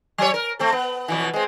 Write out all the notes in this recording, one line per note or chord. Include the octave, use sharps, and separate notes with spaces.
F#3 C#5
A#4
A3 C4 A4
B3
F2 B2 E3
G#3 C4